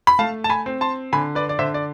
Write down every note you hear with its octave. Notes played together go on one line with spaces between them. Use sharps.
B5
A3 F5 A5
A5
G#5 B5
C4
A5 C6
D3 G#5 B5
B4 D5
D5
D3 C5 E5
D5